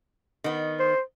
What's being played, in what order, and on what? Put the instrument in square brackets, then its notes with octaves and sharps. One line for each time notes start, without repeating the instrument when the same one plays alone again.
[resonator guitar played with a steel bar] D#3 B3
[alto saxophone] C5